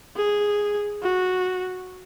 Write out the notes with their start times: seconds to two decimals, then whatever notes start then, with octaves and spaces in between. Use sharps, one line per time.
0.17 G#4
1.03 F#4